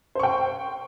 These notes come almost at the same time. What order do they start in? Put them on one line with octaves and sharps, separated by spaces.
C5 C#6 G5